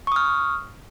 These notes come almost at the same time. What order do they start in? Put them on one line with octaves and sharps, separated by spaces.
C#6 D#6 F6